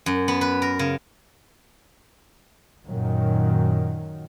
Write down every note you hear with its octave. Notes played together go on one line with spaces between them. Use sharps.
F#2
B3
B4
A#4
C#3
F#2 A#2 D#3 F#3